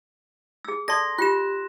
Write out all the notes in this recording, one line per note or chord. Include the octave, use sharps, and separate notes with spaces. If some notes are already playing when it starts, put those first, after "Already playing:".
G#4 E6
A4 D5 A5 C6 A#6
F4 G4 F#6 E7